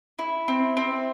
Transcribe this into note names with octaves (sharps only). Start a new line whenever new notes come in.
E4
C4
C4